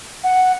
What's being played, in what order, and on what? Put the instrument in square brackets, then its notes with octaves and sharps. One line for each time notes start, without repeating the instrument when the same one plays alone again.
[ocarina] F#5